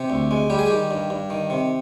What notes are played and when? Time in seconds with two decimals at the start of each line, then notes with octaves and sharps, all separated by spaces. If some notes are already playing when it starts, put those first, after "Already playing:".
Already playing: C3 G4
0.10 D2
0.31 G#3
0.50 G3 G4
0.59 G#4
0.66 D#3 G4
0.91 G2
1.10 G2
1.30 D#3
1.50 C3